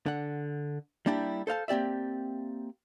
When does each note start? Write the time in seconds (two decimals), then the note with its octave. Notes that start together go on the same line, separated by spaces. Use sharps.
0.06 D3 F#5
1.06 G3 A#3 D4 E4 G4
1.47 A4 C5 F5 A5
1.68 A#3 C4 G4 D5 E5